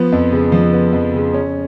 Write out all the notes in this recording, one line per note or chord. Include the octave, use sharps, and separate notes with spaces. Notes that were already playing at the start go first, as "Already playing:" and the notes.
Already playing: F3 B3
F2
C#3
F3
B3
F2
C#3
C#4